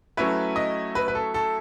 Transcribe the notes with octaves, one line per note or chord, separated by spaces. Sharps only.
F#3 A3 C#4 E4 B4
D#5
B4
B4
A4
A4